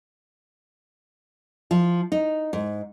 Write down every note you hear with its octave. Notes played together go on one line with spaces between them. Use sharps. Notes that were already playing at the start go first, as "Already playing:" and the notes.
F3
D#4
G#2